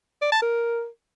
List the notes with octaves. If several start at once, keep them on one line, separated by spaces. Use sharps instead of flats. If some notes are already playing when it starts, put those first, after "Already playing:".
D5
A5
A#4